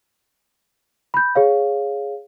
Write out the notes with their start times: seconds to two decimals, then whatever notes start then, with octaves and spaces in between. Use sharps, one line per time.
1.14 B5 G6
1.35 G#4 C#5 F5